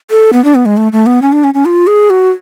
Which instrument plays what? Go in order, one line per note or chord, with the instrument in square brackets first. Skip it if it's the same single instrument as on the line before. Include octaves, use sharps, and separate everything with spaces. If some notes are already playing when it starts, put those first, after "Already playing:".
[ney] A4
B3
D4
B3
G#3
A3
A3
B3
C#4
D4
C#4
C#4
F4
G#4
F#4